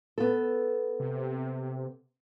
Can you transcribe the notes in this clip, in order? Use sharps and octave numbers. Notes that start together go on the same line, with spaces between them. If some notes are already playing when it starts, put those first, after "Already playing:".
B3 A4
C3